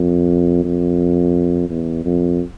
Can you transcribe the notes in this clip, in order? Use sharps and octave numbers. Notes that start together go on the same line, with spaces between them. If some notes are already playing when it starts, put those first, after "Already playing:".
Already playing: F2
F2
E2
F2